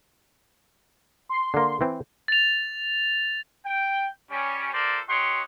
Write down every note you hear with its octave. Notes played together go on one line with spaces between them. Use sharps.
C6
D3 A#3
E3 C4
A6 F7
G5
G3 C#4
F4 A4 A#4 C5 D5
D#4 G4 C#5 F#5 C6